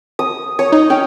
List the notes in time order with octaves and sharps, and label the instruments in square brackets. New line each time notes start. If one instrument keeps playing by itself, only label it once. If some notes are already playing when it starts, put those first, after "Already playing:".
[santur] D#6
[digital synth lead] C#5 [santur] D#6
[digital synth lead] D#4
[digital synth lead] C#4 [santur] G5